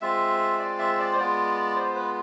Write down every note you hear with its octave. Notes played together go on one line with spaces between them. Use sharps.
G#3 C4 F4 E5
D5
E5
D5
C5
G#3 B3 F4 D5
C5
B4